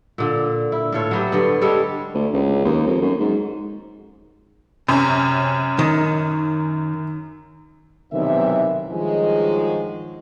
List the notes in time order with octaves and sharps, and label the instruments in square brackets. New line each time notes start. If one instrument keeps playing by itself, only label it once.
[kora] A#2 D3
E4
A2 F4 A4 C#5
F#3 B3 G4
G2 D3 B3
G3 G#3 A4 C#5
[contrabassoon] D2
C#2
D#2
F2
F#2
G#2
[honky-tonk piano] F#2 C#4 [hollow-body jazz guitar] C3
[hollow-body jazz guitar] D#3
[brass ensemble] B1 C3 D#3 E3 E5
G2 D#3 F3 F#3 G#3